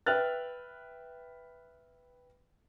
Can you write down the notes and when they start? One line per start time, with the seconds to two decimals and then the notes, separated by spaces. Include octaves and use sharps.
0.06 B4 E5 G5 F6 F#6 A6